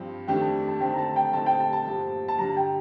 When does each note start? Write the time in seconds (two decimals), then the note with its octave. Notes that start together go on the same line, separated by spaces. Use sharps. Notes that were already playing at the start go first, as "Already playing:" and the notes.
Already playing: G2 F3 C4 G4
0.27 F2 D#3 A3 D4 G4 G5
0.41 A5
0.68 A5
0.80 D3 A3 C4 G5
0.94 A#5
0.98 A5
1.16 G5
1.33 D3 A3 C4 D#4 A5
1.46 G5
1.60 A5
1.73 A5
1.85 G2 F3 C4 G4
2.28 A5
2.38 G2 D3 G3 A#5
2.56 G5